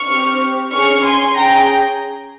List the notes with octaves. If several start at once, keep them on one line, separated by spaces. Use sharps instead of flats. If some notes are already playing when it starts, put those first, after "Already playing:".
Already playing: C#6 F6
C4 G4
C#4 G#4 C#6 F6
G#5 C6
C#4 G#4 G5 A#5